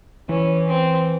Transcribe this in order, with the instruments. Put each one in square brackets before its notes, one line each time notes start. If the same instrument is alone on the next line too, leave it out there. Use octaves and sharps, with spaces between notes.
[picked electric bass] E3 [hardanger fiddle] C#4
[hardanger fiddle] C4